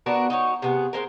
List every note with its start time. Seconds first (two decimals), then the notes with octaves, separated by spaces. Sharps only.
0.06 B3 D4 F#4 A#4
0.30 D#4 F#4 C#5
0.62 C3 B3 G#4
0.93 G#3 A#3 C4 A#4